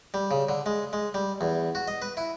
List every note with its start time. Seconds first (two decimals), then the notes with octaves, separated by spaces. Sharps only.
0.14 G3
0.31 C#3
0.49 D3
0.66 G#3
0.93 G#3
1.14 G3
1.41 E2
1.75 F#4
1.88 D#5
2.02 B4
2.17 E4